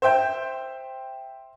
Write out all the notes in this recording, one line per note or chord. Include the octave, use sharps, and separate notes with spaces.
C5 E5 G5 G6